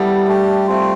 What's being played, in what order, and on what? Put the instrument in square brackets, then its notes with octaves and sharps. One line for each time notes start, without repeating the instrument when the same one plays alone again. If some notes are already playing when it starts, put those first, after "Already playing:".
Already playing: [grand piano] G3 [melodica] B3 E4 A4
[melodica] A3 D4 G4
A3 C4 F4